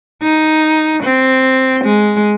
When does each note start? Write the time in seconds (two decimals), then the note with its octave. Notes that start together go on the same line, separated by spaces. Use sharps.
0.22 D#4
1.03 C4
1.84 G#3